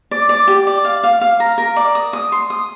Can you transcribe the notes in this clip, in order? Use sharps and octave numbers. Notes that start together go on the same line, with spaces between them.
D5
D5
G4
D5
F5
F5
F5
A#5
A#4
D5
D#6
D#6
C6
D#6